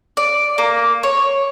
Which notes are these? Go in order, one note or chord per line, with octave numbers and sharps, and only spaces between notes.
D5
A#3
C#5